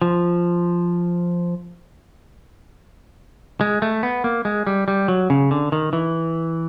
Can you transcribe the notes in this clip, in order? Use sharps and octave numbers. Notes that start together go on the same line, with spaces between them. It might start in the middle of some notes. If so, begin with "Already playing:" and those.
F3
G#3
A3
B3
A#3
G#3
G3
G3
F#3
C#3
D3
D#3
E3